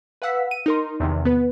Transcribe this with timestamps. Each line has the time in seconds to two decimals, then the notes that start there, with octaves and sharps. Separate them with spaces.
0.22 B4 F5 F#5 E6 B6
0.51 D#7
0.66 D#4 A#4 C6
1.00 E2 C3 D#3
1.25 B3 B4